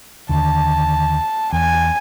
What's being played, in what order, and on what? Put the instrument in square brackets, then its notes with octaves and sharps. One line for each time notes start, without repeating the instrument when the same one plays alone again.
[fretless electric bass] D#2 D3 [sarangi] A5
[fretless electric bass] E2 [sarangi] G#5